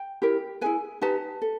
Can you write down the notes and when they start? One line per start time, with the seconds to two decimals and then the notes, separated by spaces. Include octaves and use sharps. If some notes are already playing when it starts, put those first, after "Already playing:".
Already playing: G5
0.22 E4 G4 A#4
0.61 E4 G#4 B4 G#5
1.01 D#4 G4 B4 A5
1.42 A4